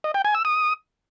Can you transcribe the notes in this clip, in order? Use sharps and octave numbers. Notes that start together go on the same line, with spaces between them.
D#5
G5
G#5
E6
D#6